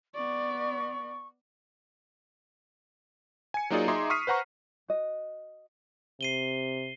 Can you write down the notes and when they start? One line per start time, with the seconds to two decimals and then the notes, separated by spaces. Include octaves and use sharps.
0.15 B3 D5 C#6
3.54 G#5 C#7
3.70 F#3 A#3 D#4 F4 G#4 D5
3.88 D#4 G#4 E5 A#5 C6 D6
4.10 C#6 D#6 F6 B6 C7 D#7
4.27 B4 C5 F#5 A#5 C#6
4.88 F#4 D#5
6.21 C3 C7 D#7 G7